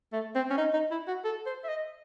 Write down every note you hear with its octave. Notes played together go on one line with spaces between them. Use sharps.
A3
C4
C#4
D#4
D#4
E4
F#4
A4
C5
E5
D#5